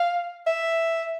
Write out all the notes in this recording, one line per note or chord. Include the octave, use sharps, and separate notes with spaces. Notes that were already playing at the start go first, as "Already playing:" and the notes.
Already playing: F5
E5